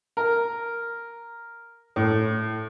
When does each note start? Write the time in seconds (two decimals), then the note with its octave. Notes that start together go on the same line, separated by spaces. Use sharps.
0.17 A#4
1.96 A2